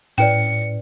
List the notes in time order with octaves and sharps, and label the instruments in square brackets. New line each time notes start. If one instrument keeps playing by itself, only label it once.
[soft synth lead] A2 [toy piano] C#4 B4 D5 [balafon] G5 [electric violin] C#7